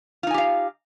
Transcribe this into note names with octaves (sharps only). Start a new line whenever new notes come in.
D#4 F4 G4 F5 G#5